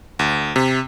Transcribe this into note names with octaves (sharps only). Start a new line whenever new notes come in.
D2
C3